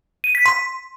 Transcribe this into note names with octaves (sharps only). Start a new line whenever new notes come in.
D#7
B6
C6